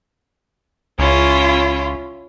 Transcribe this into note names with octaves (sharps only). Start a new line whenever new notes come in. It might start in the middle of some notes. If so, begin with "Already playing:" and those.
C#2 C#4 E4 F4